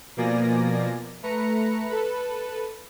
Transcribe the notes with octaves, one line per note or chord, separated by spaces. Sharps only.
B2 F3 A#3 D5 G#5 A#6
A3 B4 A#5 C#7
A4 B4